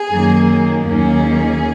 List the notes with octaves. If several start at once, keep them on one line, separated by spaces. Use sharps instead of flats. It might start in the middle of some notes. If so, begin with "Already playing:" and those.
Already playing: G#4
F#2 D#3 F#3 A#3
D#2 D#3 F#3 A#3 C#4 G#4